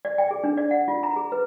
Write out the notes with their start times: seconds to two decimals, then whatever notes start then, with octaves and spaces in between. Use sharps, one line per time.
0.05 D5
0.18 G5
0.31 G#4
0.44 D4
0.57 D5
0.71 F#5
0.88 F4
1.03 A#5
1.16 G#4
1.32 B4